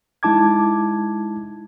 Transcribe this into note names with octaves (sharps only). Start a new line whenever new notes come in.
G#3 D#4 E4 A5 D6 G#6